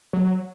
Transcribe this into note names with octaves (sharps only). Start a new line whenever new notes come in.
F#3